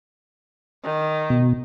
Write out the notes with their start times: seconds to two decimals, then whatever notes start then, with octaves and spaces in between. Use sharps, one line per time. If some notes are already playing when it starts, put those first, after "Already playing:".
0.83 D#3
1.30 B2